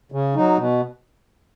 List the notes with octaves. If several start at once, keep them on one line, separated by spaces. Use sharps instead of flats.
C#3
F#3 D#4
B2